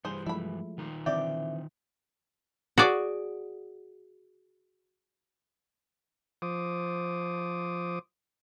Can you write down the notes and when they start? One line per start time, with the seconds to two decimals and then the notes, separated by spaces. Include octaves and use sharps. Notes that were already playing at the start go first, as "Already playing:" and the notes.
0.05 G2 E3 G3 G#4 C5
0.26 F3 G#3 A3 E4 B5
0.78 D#3 D#4 F4
1.06 D3 E3 C4 G4 D5 E5
2.78 F#4 G#4 D5
6.42 F3 C5 D6 D#6